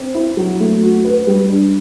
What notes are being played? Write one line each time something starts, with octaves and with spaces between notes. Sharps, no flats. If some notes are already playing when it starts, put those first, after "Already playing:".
Already playing: C4
E4
F#3
A3
F#4
B4
G3
D4